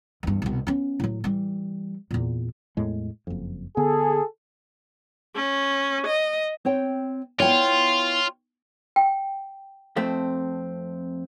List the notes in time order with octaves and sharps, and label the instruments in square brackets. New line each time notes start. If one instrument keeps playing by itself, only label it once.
[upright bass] E2 G2
C2 B2
B3 C#4
A2 F#3
E3 G3
E2 A#2
[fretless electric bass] E2 A2 G#3
F#1 F2
[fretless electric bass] D3 B3 [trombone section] G#4 A4
[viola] C#4
D#5
[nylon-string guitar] C4 C#5 G5
[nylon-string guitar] B3 E4 [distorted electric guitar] F4 [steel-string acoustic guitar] C#5 G5
[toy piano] G5
[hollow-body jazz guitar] F2 A3 C4